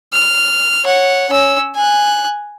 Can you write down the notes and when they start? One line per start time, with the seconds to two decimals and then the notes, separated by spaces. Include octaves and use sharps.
0.13 F6
0.84 C#5 F#5
1.29 C#4 E6
1.75 G#5 F#6